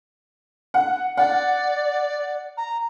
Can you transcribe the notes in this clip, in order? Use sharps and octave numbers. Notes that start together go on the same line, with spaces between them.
F#5
D5 F#5
A#5